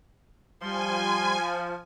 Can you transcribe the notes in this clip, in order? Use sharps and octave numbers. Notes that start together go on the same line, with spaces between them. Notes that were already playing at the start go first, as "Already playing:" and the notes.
F3 G3 G#5 C6